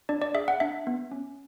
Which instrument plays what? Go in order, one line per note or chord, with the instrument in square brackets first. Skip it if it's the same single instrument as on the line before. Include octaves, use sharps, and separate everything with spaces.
[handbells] D4 D5
D5
G#4 E5
F#5
D4 E5
B3
C#4